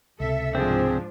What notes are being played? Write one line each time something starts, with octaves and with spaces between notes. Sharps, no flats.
C#2 C3 A4 E5
G#2 F3 C4 D4 G#4